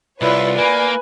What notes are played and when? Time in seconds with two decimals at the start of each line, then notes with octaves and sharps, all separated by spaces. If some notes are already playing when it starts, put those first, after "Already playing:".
0.22 C2 E4 F4 B4 C#5 D5
0.58 A#3 B4 G#5